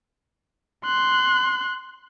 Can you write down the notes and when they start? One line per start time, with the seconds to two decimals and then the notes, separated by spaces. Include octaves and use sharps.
0.85 C6 F#6